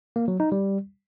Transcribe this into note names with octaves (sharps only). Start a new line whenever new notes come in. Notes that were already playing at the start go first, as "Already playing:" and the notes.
A#3
F#3
D#4
G3